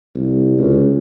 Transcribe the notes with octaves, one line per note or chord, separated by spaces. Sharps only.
C2
C#2